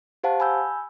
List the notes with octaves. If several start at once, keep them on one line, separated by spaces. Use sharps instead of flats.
G4 C5 F5 F#5 A5
G#5 B5 E6 G6